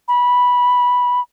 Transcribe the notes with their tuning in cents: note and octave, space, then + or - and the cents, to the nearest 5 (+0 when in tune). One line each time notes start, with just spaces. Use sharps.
B5 -10